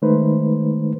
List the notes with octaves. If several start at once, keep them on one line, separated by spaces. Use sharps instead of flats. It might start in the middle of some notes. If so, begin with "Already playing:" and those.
D#3 G#3 A3 D#4 B4 C5